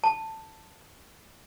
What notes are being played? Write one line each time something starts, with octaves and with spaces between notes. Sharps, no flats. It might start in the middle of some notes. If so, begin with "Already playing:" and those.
A5